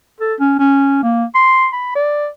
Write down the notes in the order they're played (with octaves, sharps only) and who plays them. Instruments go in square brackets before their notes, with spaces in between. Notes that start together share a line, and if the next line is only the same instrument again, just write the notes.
[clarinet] A4
C#4
C#4
A#3
C6
B5
D5